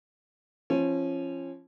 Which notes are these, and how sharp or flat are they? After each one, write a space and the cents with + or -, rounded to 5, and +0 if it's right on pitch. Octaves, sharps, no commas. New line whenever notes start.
F3 -30 C#4 -30